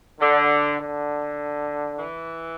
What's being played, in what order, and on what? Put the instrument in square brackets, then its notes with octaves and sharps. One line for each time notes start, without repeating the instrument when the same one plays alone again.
[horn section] D3
D3
E3